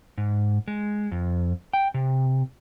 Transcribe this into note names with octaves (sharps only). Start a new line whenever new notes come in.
G#2
G#3
F2
G5
C3